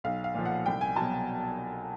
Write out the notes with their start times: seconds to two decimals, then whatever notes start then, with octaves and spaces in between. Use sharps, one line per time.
0.04 B1 F5
0.24 F5
0.35 A#2 F3
0.46 F#5
0.66 C2 G5
0.81 G#5
0.96 B2 F#3 A5